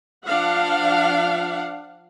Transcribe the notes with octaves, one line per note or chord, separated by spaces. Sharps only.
F3 D4 F5 F#5